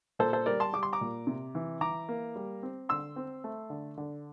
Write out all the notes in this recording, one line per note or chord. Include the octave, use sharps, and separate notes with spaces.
A#2 A4 C5
A4 C5
G3 A#4 D5
A5 C6
G3 D6
C6
A#5 D6
A#2
C3
E3
E3 A#5 D6
A#3
G3
C4
D3 C6 E6
C4
A3
D3
D3